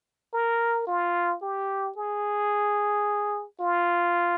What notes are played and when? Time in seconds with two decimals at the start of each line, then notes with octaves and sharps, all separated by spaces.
0.33 A#4
0.87 F4
1.42 G4
1.97 G#4
3.60 F4